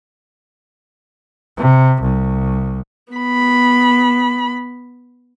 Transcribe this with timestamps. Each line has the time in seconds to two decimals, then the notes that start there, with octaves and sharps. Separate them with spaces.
1.57 C3
2.02 C2
3.13 B3 B5